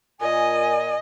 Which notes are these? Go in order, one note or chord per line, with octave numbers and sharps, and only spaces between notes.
A#2 D#5 G#5